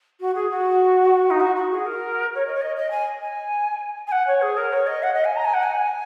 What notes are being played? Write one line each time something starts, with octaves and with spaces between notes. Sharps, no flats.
F#4
G#4
F#4
D#4
F#4
F#4
G#4
A#4
C#5
D#5
C#5
D#5
D#5
G#5
G#5
G#5
F#5
C#5
G#4
A#4
C#5
D#5
F#5
D#5
G#5
A#5
G#5
F#5
G#5